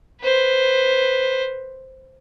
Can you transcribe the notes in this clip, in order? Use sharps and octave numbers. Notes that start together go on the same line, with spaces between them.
B4 C5